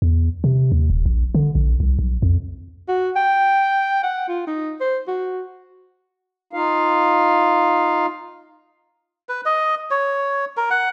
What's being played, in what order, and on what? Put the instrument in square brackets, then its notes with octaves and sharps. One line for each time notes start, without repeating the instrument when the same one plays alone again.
[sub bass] E2
C3
D#2
D#1
A#1
D3
A#1
C2
B1
F2
[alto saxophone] F#4
G5
F#5
F4
D#4
C5
F#4
[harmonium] D#4 F4 F5
[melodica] B4
D#5
C#5
A#4
F#5